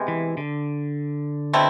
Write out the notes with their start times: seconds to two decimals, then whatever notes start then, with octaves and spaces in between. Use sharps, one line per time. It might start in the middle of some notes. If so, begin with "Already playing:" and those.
Already playing: C3 G#3 B3
0.08 E3
0.37 D3
1.53 B2 A3 C4 E4